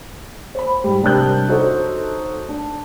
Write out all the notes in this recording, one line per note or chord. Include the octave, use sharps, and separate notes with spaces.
C5 B5
G#2 G3
C3 G3 D4 A#4 F#6 G6
D#4 F#4 A4 C5 C#5
D4